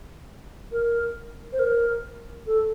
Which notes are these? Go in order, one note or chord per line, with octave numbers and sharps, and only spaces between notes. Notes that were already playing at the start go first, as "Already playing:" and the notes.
A#4
C5
A#4
A4